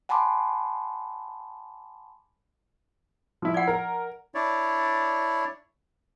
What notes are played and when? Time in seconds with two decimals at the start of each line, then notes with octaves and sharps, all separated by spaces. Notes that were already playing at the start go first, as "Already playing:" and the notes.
0.09 F#5 G#5 A5 B5 C6 D6
3.42 F3 E4
3.54 D5 F#5
3.67 A#4
4.35 D4 E4 C#5 D5